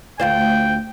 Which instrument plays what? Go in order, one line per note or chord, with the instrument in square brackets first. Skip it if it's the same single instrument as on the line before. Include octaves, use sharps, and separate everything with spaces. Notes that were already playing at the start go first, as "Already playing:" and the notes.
[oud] D2 F4 C5 [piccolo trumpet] G5